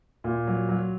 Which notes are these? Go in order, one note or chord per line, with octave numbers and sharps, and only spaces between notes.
A#2
F#3
F#3